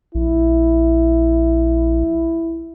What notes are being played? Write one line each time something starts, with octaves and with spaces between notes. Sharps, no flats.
A#1 E4